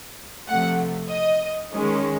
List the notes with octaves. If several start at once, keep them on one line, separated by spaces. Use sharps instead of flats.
C3 F3 A3 F#5
D#5
D#3 G#3 C#4